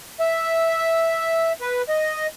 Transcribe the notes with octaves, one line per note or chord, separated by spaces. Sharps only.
E5
B4
D#5